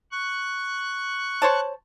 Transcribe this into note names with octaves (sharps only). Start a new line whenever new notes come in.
C#6 F#6
C5 C#5 A5